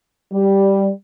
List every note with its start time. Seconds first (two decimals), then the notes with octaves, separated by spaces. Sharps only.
0.32 G3